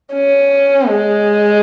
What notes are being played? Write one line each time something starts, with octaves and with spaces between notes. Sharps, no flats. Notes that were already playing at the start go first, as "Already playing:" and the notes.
C#4
G#3